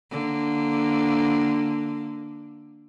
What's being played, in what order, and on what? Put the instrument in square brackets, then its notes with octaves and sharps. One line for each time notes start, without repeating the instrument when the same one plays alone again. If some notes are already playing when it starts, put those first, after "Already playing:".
[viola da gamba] D3 A#3